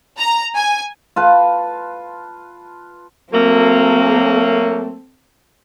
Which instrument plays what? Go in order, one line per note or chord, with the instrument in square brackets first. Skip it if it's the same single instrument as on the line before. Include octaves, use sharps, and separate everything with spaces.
[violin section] A#5
G#5
[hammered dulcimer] F4 B4 A5
[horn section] F#3 A3 A#3 [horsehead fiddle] C4 A4